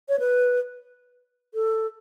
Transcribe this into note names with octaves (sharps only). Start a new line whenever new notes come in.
C#5
B4
A4